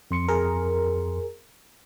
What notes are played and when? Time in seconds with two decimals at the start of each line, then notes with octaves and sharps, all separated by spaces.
0.11 F2 C6 C#7
0.28 G#4 A#4